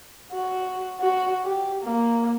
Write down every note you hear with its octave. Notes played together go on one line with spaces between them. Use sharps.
F#4
F#4
G4
A#3